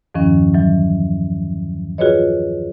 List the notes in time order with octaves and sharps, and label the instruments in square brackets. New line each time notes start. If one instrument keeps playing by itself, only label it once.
[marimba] E2 G2 D#3 F3 C#4
E3 F#3
F4 F#4 G#4 B4 C#5 D#5